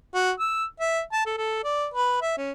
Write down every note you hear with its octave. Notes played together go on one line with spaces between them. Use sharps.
F#4
E6
E5
A5
A4
A4
D5
B4
E5
C#4